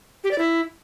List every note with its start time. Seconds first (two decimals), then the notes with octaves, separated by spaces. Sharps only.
0.24 G4
0.31 D5
0.38 E4